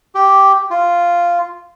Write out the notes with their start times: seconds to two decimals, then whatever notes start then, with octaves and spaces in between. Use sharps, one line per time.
0.15 G4
0.70 F4